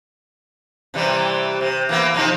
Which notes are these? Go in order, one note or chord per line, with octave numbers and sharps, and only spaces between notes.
C3 E3 G3
C3
E3 A#3 B3
C3 F3 D#4